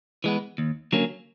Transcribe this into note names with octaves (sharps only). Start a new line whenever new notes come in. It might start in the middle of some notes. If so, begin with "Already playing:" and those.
E3 G#3 B3
D#2
D3 F#3 A#3 C#4